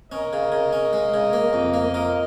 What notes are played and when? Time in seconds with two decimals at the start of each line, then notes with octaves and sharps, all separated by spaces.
0.11 C#4 A#4 D#5
0.33 C#3
0.52 C#3
0.73 C#4
0.93 G#3
1.14 C#3
1.33 A#3
1.53 F2
1.74 A#3
1.94 F4 A#4 D#5